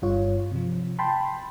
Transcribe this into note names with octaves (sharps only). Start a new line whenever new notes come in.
G1 G2 F4 C#5
C3 F3
G5 A5 B5 C6